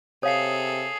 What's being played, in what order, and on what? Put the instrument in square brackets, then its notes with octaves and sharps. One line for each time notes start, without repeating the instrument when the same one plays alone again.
[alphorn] C3 [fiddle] G#4 A4 [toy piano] C#5 F5 [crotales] D#6 C7